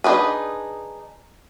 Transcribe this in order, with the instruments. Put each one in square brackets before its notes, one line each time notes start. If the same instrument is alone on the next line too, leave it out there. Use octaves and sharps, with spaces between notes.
[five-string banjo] D4 D#4 F#4 G#4 B4